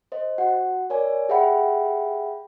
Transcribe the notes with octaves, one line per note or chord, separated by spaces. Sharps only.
C5 D#5
F#4 F#5
A#4 C#5 D5 G#5
G4 G#4 E5 F#5 G5 B5